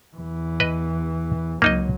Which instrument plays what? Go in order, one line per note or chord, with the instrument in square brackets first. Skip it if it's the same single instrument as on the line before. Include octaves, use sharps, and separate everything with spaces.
[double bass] E2 E3
[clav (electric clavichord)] B4 D#5
[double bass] C#2 F#3 [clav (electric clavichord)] A#3 D#4 D#5